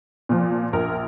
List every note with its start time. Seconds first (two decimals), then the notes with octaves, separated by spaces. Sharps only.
0.29 A#2 F3
0.73 A#1 A#4